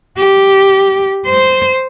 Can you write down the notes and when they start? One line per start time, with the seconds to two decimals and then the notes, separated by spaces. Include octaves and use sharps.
0.17 G4
1.26 C5